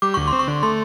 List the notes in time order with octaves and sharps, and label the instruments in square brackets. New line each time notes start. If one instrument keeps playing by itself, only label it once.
[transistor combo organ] G3 [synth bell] D6
[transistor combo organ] D2 [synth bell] C#6
[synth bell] C6
[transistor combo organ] C4
[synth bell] C#6
[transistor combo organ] D3
[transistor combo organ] A3 [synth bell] C6